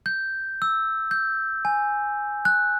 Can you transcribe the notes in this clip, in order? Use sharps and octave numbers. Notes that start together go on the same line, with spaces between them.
G6
E6
G6
G#5
F#6